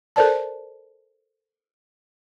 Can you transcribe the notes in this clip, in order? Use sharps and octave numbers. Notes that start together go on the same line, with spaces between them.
A4 A#4 C5 D5 A5